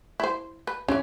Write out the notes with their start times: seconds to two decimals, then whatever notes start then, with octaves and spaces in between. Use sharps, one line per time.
0.20 E4 C5
0.67 B4
0.88 C#3 E3 C#4